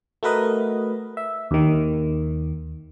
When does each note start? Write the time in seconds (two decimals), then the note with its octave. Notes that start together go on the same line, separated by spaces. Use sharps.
0.23 A3 F#4 A#4 B4 D#5
1.17 E5
1.51 D#2 D#3